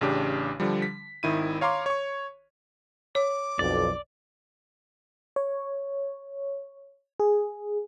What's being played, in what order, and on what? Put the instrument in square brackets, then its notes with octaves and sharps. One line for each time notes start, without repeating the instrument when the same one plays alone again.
[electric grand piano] A1 C#3 D4 G4
D3 F3 G3
B6
G#1 D#3 E4 D#7
C#5 F5 A#5 C6 D6
C#5 C#6
[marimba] C#5 [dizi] D6
[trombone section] B1 F2 [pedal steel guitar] D5
[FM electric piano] C#5
G#4